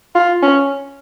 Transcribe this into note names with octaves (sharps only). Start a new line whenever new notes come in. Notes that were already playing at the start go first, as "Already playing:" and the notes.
F4
C#4